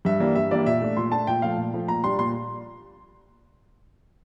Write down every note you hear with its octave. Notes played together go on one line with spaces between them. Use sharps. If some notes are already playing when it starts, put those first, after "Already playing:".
G2 E5
E3 G3 A#3 D4
G2 E5
E3 G3 A#3 D4 D5
A#2 E5
A3 D4
A#2 C6
A3 D4 A5
A#2 G5
F3 A3 F5
A#2
F3 A3
A#2 A#5
G3 D4 C6
A#2 C6